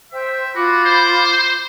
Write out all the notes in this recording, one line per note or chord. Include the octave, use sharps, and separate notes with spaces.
C5 E5 G5
F4 F#4 B5 D6
C5